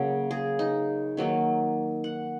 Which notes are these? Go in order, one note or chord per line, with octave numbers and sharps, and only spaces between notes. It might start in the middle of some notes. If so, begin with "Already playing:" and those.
Already playing: C#3 F#3 A#3
G#4
D#4
D#3 F#3 A#3
F#5